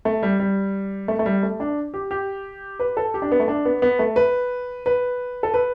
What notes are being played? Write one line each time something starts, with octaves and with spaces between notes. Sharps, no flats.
A3
G3
G3
A3
A3
G3
A3
D4
G4
G4
B4
A4
G4
D4
B3
A3
D4
B3
B3
A3
B4
B4
A4
B4